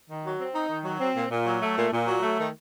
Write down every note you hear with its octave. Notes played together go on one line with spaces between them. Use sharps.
D#3
F#3
C4
D#4
D#3
F#3
C4
A#2
A#2
F#3
A3
A#2
A#2
F#3
A3
D#3